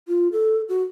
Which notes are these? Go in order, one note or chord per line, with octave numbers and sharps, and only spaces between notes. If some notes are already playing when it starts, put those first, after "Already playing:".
F4
A4
F#4